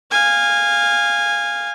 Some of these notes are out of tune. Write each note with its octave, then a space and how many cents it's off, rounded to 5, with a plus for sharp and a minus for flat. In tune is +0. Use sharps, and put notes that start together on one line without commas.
F5 +0 G#5 -20